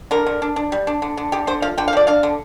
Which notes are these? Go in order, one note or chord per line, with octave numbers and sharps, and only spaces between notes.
D3 A#4
D3
D4
D4
G3
D4
D3
D3
D3 G4
D3 C5
F3 F5
D3 G5
F5
F3 D5
D4 F5
D3